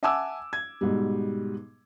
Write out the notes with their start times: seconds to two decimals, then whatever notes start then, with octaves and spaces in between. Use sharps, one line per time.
0.03 E5 F#5 G#5 A5 D6 E6
0.53 G#6
0.81 G#2 B2 G3